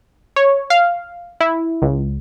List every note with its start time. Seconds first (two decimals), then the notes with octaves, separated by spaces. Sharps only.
0.36 C#5
0.70 F5
1.41 E4
1.82 C#2